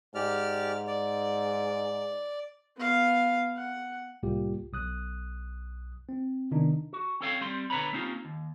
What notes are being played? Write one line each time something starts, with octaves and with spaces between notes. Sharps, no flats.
G#2 G4 D5 F6
D5
B3 F5
F#5
C2 A2 G3 A#3 F4 G4
B1 D#6 F#6
C4
C3 D#3 B3 D4 D#4
F#4
C4 C#4 A4 C#5 F5 G5
G3 C4 C6
B2 D3 B4 C#5 A#5 B5
A#3 C4 C#4 D#4 F4 G4
D#2